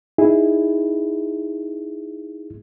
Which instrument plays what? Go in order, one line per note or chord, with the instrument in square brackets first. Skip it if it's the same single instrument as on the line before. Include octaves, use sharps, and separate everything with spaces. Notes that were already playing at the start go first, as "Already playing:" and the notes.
[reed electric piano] D#4 E4 G#4